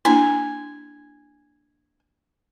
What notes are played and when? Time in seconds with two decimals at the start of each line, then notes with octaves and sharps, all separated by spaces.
0.05 A#3 D4 E4 G#5